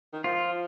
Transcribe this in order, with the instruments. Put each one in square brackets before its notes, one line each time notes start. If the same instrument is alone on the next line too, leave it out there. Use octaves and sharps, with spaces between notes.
[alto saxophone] D#3
[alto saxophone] F3 [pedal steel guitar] F4